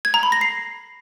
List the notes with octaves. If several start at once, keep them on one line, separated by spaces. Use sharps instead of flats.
G#6
A#5
B5
A#6
C7